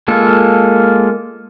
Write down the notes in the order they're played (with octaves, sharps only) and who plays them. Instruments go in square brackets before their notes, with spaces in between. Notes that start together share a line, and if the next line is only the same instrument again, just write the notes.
[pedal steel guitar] G#3 A#3 F4 A4